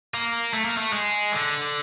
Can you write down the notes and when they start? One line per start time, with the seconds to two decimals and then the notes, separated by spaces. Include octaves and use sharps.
0.14 A#3
0.54 A3
0.65 A#3
0.77 A3
0.93 G#3
1.32 D3